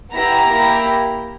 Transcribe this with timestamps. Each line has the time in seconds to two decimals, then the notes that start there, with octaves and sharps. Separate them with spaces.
0.13 B3 E4 G4 A#5
0.50 A#3 E4 G4